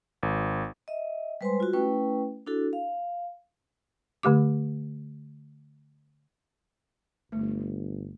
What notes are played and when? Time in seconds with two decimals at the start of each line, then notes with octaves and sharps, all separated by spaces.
0.23 G#1
0.88 D#5 E5
1.41 G3 G#3 B4 C5 G#5 C6
1.60 F4 F#4
1.73 A3 C#4 E4 B4 G5
2.46 D4 E4 F#4 A4
2.73 F5
4.23 D3 A3 G4 D6
7.32 G1 A3